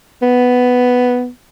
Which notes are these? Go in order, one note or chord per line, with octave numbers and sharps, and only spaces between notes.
B3